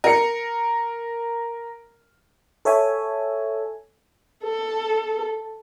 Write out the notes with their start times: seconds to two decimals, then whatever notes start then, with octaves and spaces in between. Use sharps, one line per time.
0.04 A#4 C#7
2.65 A4 C#5 E5 G#5
4.43 A4